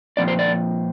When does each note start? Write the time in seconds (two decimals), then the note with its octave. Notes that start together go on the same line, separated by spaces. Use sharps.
0.17 A#2 F3 C4 D5
0.28 C5
0.39 D5